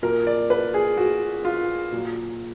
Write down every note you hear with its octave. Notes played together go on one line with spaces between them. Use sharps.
A#2 F#3 A#4
D5
B4
G#4
F#4
F4
A#2 F#3